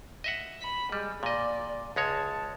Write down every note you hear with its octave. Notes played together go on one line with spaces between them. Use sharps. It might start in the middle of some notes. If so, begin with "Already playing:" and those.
D#5 E5 F#5
B5
G3 G#3
A#2 D5 D#5
C#2 G#3 C#5 A5